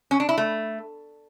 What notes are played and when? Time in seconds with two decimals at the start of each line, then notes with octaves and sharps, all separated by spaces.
0.11 C#4
0.20 D4
0.29 E4
0.38 A3